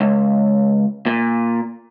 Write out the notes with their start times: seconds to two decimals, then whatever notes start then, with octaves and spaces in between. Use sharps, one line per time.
0.01 C#2
1.06 A#2